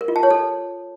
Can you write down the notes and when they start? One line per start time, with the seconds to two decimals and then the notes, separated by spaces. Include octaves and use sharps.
0.01 A#4
0.08 F4
0.16 A5
0.23 C#5
0.30 A4